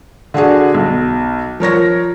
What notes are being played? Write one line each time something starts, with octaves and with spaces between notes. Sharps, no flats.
D3 D4 F#4 G#4
B1
F3 A#4 C#5 A#6